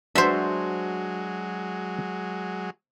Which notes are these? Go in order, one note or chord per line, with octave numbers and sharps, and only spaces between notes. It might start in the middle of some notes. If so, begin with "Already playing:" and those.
F#3 G#3 D4 F#4 C5 E5 A5